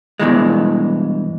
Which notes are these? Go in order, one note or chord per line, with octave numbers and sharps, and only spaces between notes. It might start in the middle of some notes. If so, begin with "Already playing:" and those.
G2 B2 E3 G#3